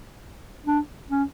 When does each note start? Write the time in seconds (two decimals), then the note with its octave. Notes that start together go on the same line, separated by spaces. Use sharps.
0.66 D4
1.10 C#4